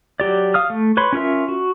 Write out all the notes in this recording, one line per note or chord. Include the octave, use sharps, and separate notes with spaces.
F#3 G4 D5
F5 D#6 F6
A3
B4 C#5 B5 C6
C#4 F4 A#4 E5
F#4